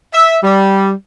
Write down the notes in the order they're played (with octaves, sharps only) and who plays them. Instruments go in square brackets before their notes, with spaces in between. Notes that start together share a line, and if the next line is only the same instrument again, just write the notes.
[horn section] E5
G3